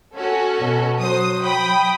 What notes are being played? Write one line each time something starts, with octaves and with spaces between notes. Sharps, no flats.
C#4 F#4 A4
B2
F#3 C5 D#6
G5 B5 D#6